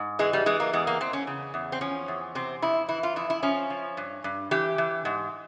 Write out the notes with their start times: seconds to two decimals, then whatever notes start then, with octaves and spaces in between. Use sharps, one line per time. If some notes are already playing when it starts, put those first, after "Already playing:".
Already playing: G#2
0.19 E3 G#3
0.33 G3
0.46 E3 G#3
0.60 A#3
0.73 E2 G#3
0.87 A#3
1.00 E2 C4
1.13 C#4
1.27 C#3
1.54 E2
1.72 C4
1.81 F3 C#4
2.08 E2
2.35 C3 C4
2.62 F2 E4
2.89 E3 E4
3.03 F4
3.16 F2 E4
3.30 E4
3.43 F3 C#4
3.70 F3
3.97 G2
4.24 G2
4.51 E3 G4
4.78 E3
5.05 G#2